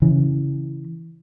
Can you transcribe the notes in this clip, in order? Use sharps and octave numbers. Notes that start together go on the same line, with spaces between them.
C#3 E3